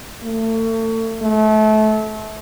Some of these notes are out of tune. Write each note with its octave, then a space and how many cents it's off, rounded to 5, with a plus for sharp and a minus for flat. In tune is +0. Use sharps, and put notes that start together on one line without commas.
A3 +35
A3 -30